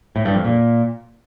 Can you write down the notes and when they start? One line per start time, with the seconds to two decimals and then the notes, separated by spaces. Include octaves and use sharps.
0.16 A2
0.25 G2
0.35 F2
0.45 A#2